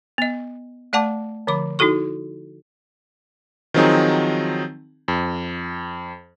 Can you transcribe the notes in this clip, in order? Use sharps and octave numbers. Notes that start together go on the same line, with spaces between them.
B3 D#5
A3 D5 F#5 A5 D6
D3 F3 B5 D6
D#4 E4 F#4 A4 C#6
D#3 F3 F#3 C4 D#4 G#4
F2